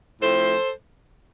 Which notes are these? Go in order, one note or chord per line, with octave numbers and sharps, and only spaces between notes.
A2 F3 A3 C4 A4 C5